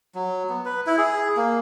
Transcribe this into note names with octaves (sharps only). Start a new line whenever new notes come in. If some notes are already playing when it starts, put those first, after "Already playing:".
F#3
B3
B4
E4
G#4
A#3